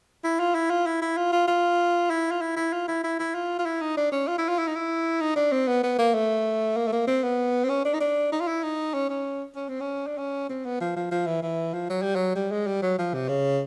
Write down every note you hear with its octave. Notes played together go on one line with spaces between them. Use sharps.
E4
F4
E4
F4
E4
E4
F4
F4
F4
E4
F4
E4
E4
F4
E4
E4
E4
F4
F4
E4
D#4
D4
C#4
F4
E4
F4
E4
D#4
E4
D#4
D4
C4
B3
B3
A#3
A3
A#3
A3
A#3
C4
B3
C4
C#4
D4
D#4
D4
D#4
F4
E4
D#4
C#4
C#4
C#4
C4
C#4
D4
C#4
C4
B3
F3
F3
F3
E3
E3
F3
F#3
G3
F#3
G3
G#3
G3
F#3
F3
C3
C#3